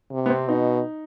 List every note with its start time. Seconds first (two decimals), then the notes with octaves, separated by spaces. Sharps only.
0.12 C3
0.26 B3
0.30 C4
0.48 B2 D#4